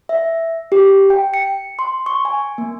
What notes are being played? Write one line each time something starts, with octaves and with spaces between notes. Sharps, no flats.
E5
G4
G5
C#7
C6
C#6
G#5
A#3